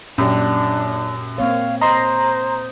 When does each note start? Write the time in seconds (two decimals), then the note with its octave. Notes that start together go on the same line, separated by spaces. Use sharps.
0.18 F#2 A#2 D4 G4
1.38 A#3 C4 C#5 F5
1.81 C5 D#5 A#5 C6